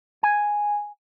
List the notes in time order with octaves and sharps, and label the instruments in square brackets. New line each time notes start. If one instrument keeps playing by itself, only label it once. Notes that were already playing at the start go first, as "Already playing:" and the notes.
[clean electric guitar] G#5